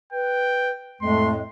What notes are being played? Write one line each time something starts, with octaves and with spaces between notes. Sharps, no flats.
B4 G5
F2 A2 G#3 A3 C6